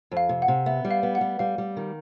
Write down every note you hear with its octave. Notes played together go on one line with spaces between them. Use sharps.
F2
F5
C3
F#5
C3
B3 E5
G3
F5
B3
F#5
G3
G3 F5
G3
D#3